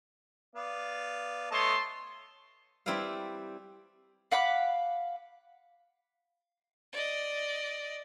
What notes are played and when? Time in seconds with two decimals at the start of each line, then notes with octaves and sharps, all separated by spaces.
0.55 B3 D5 F5
1.51 A3 B3 C#5 D#5 A5 C6
2.86 G3 C4 E4 B4 D5 F5
4.31 F5 F#5 B5 D6
6.92 D5 D#5